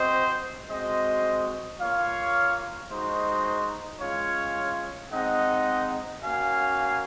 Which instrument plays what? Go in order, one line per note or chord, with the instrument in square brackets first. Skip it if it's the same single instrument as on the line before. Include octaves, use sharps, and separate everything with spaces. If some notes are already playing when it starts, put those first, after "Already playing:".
Already playing: [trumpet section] C4 F#4 C5 D#5
G#3 C4 F#4 C5 D#5
A#3 F4 C#5 F5
G#3 D#4 F#4 C5 D#5
G#3 C#4 F4 C#5 F5
G#3 C4 D#4 D#5 F#5
A#3 C#4 F#4 F5 G#5